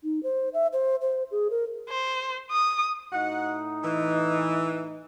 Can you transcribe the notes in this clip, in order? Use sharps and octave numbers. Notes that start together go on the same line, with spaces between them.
D#4
C5
E5
C5
C5
G#4
A#4
C5
D#6
A2 D#4 F#4 F#5
E3